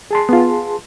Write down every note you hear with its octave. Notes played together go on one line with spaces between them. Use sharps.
G#4 A5 C6
B3 F4